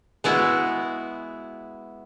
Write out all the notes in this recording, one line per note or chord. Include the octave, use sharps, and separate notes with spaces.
G#3 B3 E4 F#4